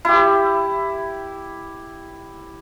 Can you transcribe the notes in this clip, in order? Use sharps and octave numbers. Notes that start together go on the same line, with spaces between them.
E4 G4